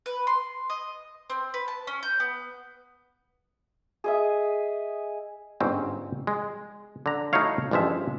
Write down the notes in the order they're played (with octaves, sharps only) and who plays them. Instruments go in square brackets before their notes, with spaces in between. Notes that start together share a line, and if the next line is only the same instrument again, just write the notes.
[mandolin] B4
C6
D#5
C4
B4
A5
C#4
G6
B3
[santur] G#4 D#5 E5
[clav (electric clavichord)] G1 G#2 C4 C#4
G#3
D3 A#5
A3 D#4 E4 F#4 C#5 F5
A1 G2 F3 G#3 E5